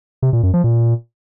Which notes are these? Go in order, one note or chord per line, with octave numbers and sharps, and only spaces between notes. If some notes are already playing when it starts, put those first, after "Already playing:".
C3
A#2
F#2
F3
A#2